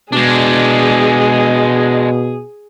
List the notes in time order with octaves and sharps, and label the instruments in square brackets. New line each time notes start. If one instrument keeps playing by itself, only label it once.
[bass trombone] B2 [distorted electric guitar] G#3 D4 [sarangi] G#4